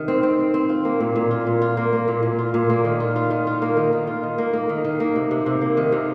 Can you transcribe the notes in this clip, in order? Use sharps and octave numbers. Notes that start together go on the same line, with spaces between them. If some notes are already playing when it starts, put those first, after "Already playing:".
Already playing: C3 D#3
C4
C4
C4
C4
F4
A#3
A#2
A#2
F4
A#2
F4
A#3
A#3
A#2
A#2
F4
A#2
A#3
D#3
F4
F4
D#3
F4
A#3
D#3
D#3
F4
D#3
A#3
A#3
D#3
D#3
A#3
C3
C3
C3
A#3
D#3
C3